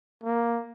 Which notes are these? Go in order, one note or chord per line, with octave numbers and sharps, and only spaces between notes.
A#3